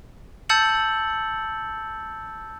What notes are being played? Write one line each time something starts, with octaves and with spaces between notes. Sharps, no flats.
A5 E6 G6 A6 C#7 F#7